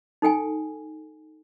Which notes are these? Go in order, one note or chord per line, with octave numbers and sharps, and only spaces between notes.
D#4 A4 G5 G#5